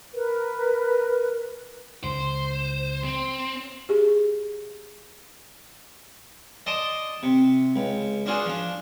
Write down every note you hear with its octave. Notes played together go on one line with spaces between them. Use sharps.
A#4 B4
C#2 C5
C4
G4 G#4
D5 D#5 A5 C6 D6 D#6
C3
C#2
D4 F4 F#4 G#4 D5
F3 D4